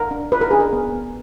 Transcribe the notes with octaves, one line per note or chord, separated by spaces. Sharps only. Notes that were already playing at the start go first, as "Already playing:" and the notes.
Already playing: A#4
D4
F4 B4
A#4
D4 G#4
A#4
B3
B3